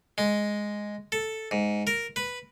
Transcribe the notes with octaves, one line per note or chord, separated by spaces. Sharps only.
G#3
A4
G#2
A#4
B4